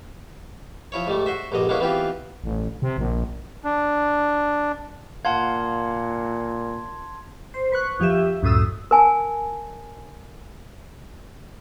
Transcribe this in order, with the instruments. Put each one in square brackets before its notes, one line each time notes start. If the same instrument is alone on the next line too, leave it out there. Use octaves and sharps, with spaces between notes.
[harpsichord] F3 E4 C#5
G#2 G3 A3
F#4 C5 E5
A#1 G2 D3 D#5
G#3 A#3 B3 C#4 E4
E3 B3 C4 F4 G4
[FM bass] A1
C3
A#1
[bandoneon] D4
[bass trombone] A#2 [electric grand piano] F5 F#5 [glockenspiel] A5 C6 G#6
[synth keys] C5
B4 C#6 F#6
F2 F3 G4 E5
C#2 F#2 A2 D#6 E6
[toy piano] A#4 G#5 A5